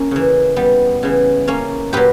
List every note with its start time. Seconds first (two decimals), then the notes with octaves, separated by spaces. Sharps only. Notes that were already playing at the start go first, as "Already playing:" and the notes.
Already playing: A#3 C#4
0.11 C#3 E3
0.56 G3 B3
1.03 C#3 E3
1.48 A#3 C#4
1.93 A#2 F#3 G4 B4